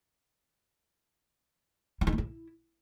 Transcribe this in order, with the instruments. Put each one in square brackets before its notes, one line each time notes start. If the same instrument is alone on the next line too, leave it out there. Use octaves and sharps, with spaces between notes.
[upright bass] E4
D#4
A#3
E4